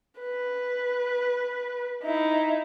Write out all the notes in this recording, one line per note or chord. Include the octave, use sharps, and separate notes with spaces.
B4
D#4 E4